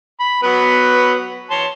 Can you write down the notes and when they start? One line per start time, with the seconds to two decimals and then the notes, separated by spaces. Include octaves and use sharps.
0.20 B5
0.43 F#3 B3 B4
1.51 C#5 A5 C6